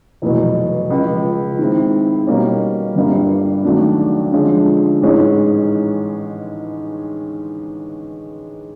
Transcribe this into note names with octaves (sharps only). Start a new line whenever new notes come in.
F1 E2 B2 F#3
C#2 C#3 F3
D#3 G#3 C4 E4
B2 G3 A#3 C#4
G1 G2 D3 G3 A#3
D#2 C#3 F#3 A3 D4
D3 F3 G#3 C#4
A1 G#2 E3 G#3 C#4